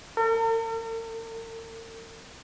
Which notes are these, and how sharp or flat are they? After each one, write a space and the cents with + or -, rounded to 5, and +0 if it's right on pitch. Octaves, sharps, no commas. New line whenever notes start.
A#4 -45